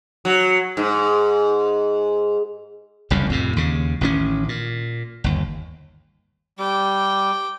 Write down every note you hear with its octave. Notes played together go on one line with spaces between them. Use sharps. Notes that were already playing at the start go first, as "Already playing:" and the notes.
F#3
G#2
F#1 C2 F2 C#3
F2 A2 C3
D#2 C#3
A1 D#3 F#3 C#4
A#2
G1 D#2
G3 G5 D6